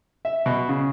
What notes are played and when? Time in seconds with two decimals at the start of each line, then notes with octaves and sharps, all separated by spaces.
0.25 E5
0.46 B2
0.69 C#3